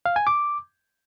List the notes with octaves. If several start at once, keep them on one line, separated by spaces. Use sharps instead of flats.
F5
G#5
D6